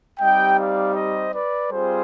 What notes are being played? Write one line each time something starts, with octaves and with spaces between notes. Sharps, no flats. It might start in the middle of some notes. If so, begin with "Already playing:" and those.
G3 C4 D#4 G4 D#5 G5
D5 F5
C5 D#5
B4 D5
G3 C4 F4 G#4 C5